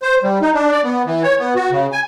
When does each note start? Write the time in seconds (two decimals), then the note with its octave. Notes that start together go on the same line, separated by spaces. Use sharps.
0.02 C5
0.23 G3
0.42 D#4
0.54 D4
0.71 D5
0.84 B3
1.06 E3
1.23 C#5
1.39 B3
1.55 F#4
1.71 C#3
1.92 G#5